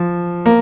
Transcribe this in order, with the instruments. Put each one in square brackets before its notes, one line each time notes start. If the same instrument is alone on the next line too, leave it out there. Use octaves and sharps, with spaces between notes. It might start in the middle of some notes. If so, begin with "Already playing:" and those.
Already playing: [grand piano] F3
A#3